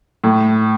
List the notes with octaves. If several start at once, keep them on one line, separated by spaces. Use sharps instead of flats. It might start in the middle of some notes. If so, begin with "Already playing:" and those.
A2